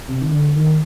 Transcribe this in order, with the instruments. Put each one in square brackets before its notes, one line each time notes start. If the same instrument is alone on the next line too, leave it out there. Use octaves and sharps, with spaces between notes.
[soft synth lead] C3
D#3
D3
D#3